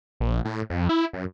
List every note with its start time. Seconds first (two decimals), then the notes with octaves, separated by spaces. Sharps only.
0.20 A#1
0.45 A2
0.70 F2
0.89 E4
1.13 F#2